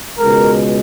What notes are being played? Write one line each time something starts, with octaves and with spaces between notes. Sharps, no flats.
C#2 B2 G#3 A#4